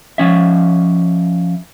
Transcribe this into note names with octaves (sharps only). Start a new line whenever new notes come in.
F3 C#4 E5